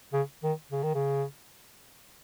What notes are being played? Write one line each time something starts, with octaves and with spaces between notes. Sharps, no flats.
C#3
D#3
C#3
D#3
C#3